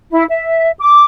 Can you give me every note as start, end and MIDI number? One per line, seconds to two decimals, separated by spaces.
0.12 0.24 64
0.30 0.70 76
0.79 1.05 86